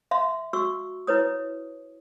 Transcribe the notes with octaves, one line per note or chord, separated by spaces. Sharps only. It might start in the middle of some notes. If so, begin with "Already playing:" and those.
E5 F5 C6
F#4 C#6 E6
E4 B4 C#5 D#6